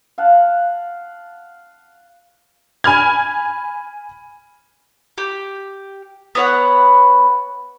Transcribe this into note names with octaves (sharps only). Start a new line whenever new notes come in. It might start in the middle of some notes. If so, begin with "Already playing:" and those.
F5 F#5 A5
G#5 B5 F6 G#6
G4
B3 C#5 F#5